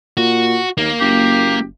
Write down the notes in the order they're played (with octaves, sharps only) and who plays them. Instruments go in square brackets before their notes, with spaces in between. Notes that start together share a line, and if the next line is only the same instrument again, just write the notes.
[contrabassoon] A#2 [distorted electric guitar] F#4
[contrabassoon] D#2 [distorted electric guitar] A#3
[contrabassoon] F#1 [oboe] G4